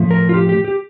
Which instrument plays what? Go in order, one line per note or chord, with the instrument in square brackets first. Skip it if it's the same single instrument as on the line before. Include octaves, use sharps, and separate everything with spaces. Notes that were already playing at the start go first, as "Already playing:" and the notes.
Already playing: [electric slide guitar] A2 F3 A3
A#4
F4
G4
G4
G4